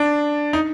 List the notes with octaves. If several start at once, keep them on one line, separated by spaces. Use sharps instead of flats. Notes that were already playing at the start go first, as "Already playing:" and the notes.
Already playing: D4
D#4